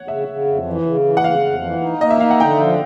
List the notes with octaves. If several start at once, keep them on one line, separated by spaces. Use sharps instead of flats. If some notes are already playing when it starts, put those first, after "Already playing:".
Already playing: C#5 F#5
C#3 E5
C#3
F2
E3
C#3
E3
F#5
C#3 F5
F2
E3
D#4
A#3 D#5
E5
D#4 F5
F#5
D3 G5
F3